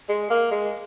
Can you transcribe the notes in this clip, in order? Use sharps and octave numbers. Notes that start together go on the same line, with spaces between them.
G#3
A#3
G#3